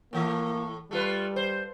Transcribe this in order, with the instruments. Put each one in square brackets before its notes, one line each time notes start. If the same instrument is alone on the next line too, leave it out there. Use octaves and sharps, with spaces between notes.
[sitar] A2 E3 A3 [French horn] A#3
[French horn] G3 [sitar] A3 F4 B4
[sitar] C5